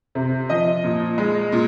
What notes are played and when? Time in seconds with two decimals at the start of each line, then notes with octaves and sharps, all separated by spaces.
0.15 C3
0.50 F3 D#5
0.84 A#2
1.18 G#3
1.52 A#2